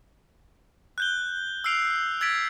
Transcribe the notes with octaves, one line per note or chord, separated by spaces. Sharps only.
F#6 G6 G7
E6 F6 C7 D7 F7
E6 G#6 A6 B6 D7